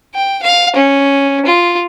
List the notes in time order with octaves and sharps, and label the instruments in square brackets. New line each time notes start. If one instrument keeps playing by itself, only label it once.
[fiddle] G5
F5
C#4
F4